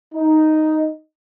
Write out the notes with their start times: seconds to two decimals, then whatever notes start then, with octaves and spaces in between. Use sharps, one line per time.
0.14 D#4